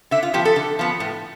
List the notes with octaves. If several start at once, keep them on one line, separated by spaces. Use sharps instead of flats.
D3 E5
F4
F3 B3 G4
A4
D3
F3 B3
A2